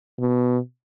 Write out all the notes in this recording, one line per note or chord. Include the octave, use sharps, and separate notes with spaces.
B2